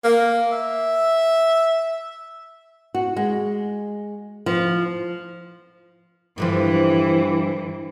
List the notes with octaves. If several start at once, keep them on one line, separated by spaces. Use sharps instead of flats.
A#3
E5
F#4
G#3
F3
G2 D3 E3 F3